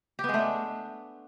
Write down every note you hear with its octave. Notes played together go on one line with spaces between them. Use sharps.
G4
B3
G#3
A3
D4